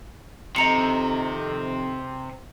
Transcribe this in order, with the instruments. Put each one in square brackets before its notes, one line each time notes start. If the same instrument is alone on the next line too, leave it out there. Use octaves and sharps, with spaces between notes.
[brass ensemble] F2 D#3 C4 [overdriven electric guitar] C3 [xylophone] D#5 A#5 C#7